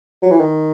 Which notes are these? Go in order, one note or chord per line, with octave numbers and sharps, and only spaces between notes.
F#3
E3
D#3